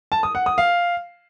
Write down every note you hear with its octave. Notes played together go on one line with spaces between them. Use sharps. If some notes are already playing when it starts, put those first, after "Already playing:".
A5
D#6
F#5
D#6
F5